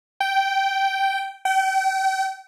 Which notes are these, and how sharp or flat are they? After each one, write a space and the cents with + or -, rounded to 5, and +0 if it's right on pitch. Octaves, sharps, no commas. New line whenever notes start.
G5 -10
G5 -35